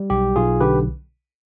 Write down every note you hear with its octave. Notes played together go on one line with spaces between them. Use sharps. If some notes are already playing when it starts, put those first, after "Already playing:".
Already playing: G3
B1 G4
B1 F4 G#4
D3 G4 B4